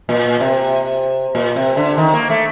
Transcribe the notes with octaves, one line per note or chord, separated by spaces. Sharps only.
A#2
C3
A#2
C3
D3
D#3
A#3
A3